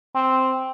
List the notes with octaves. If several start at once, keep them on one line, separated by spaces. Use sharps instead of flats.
C4